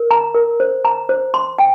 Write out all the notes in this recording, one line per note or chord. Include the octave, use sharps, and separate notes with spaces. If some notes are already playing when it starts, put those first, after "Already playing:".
Already playing: A#4
A#5
A#4
C5
A#5
C5
C6
G5